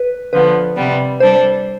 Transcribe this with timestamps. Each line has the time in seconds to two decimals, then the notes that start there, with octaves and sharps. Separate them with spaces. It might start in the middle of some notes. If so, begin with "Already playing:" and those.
Already playing: B4
0.33 D3 F3 B3 B4
0.76 C3 G3 B3
1.20 G3 D4 A4 C5